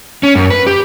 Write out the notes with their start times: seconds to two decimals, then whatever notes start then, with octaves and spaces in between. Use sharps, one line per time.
0.23 C#4
0.35 F#2
0.50 B4
0.67 G4